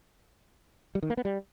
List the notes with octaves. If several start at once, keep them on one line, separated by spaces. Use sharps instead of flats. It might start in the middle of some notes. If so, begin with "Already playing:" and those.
G3
D#3
A#3
B3
G3